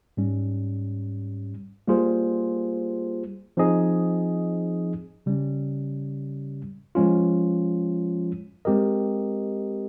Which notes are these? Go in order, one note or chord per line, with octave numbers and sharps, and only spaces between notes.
G#2 G3 C#4
G3 A#3 F4 G#4 C5
F3 C4 D#4 G#4 D#5
C#3 G3 C#4
F3 G#3 C#4 F4
G#3 C4 G4 A#4 D#5